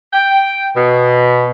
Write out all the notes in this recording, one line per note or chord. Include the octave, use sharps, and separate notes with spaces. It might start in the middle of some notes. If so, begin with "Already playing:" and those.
G5
B2